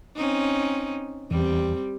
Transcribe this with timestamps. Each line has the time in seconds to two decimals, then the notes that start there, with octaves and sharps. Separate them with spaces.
0.16 C4 C#4 D#4
1.31 E2 G3 C4